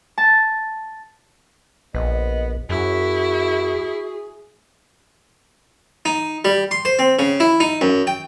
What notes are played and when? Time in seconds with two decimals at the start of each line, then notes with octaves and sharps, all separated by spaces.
0.18 A5
1.94 A#1 B3 D#5
2.69 F#2 E4 F#4 G#4
6.05 D#4
6.45 G3
6.71 C6
6.85 C5
6.99 C4
7.19 C#3
7.40 E4
7.60 D#4
7.81 F#2
8.07 G5